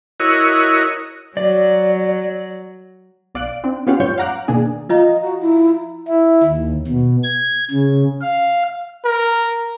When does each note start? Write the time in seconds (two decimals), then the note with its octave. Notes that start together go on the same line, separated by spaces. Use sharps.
0.20 E4 F#4 A#4 C#5 D#5
1.37 F#3 D5
3.35 B1 D5 F5 F#6 D7
3.64 C4 D4
3.87 B3 C#4 F4 G4 F5 F#5
4.00 F#2 A2 G3 F4 C#5 G6
4.18 F5 F#5 A#5 D6 F#6
4.48 B2 D#3 A#3 D4 G#4
4.89 F3 F4 D#5 A#5
5.22 F#4
5.40 E4
6.07 E4
6.43 D#2
6.87 B2
7.23 G#6
7.71 C#3
8.21 F5
9.05 A#4